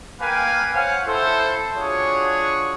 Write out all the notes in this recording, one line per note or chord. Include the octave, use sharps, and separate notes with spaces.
A#3 A#4 B4 F5 G5 G#5
C5 C#5 F5 F#5 G#5
E4 A4 C5
D4 F4 F#4 G#4 C#5